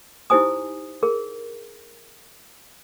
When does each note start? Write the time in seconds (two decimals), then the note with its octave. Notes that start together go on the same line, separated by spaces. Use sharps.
0.30 D#4 E4 G4 C5 G#5 D#6
1.03 G#4 A#4